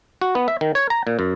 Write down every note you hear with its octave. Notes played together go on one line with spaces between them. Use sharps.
F#4
B3
E5
D#3
C#5
A#5
A#2
F#2